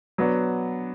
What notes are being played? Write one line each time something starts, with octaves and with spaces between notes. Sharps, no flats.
F#3 B3 D4